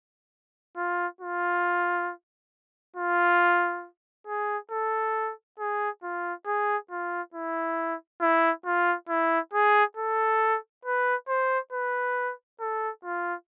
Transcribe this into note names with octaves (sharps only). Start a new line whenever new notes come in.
F4
F4
F4
G#4
A4
G#4
F4
G#4
F4
E4
E4
F4
E4
G#4
A4
B4
C5
B4
A4
F4